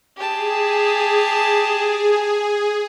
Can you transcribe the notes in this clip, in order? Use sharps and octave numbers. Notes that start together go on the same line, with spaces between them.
G4 G#4 A5